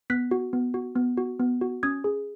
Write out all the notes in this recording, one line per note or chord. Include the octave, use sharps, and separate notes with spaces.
B3 F#6 B6
F#4
B3
F#4
B3
F#4
B3
F#4
C#4 D#6 G#6
G#4